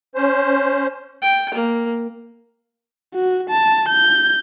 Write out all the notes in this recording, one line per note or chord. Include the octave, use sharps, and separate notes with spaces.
C#4 C5
G5
A#3
F#4
A5
G6